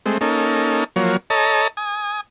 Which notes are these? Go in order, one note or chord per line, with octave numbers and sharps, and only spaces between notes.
G#3 A3 C4
A#3 C#4 D#4 A4
F3 F#3 A#3 C#5
A4 C#5 D#5 A5 A#5
G#5 D#6